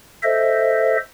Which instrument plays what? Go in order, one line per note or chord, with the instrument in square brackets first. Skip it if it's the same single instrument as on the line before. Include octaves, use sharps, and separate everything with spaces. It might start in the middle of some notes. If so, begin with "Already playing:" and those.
[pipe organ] A4 C5 D#5 E5